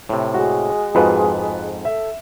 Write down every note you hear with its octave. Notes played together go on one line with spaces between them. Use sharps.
A2 C3
G#3 F#4
F2 G#2 F4 F#4 B4
A4 E5